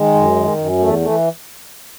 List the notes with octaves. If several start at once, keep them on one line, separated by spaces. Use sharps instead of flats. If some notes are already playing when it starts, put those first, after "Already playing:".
Already playing: D#3 G#3
F#2
D#3
F#2
E2 A3
E3 A3